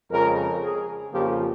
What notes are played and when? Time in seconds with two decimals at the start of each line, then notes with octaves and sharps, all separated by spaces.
0.11 F2 C#3 G#3 A#4
0.62 G#4
1.13 F2 C#3 F3 A#3 G4